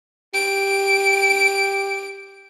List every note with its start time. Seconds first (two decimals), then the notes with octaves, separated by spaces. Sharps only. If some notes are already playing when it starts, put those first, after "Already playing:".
0.34 G4 D7